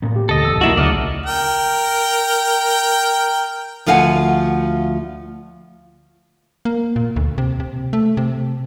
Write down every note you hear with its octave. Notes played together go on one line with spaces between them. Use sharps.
A2 A#3 B3
G4
D2 B2 A4 D#5
F#1 E2 E6
B1 A#3 E4 F#4
D2 C#3 D5 D#5 F#5 F6
A#4 G5
D2 F3 F5 F#5 G#5
A#3
A#2
D2
C3
C3
A3
C3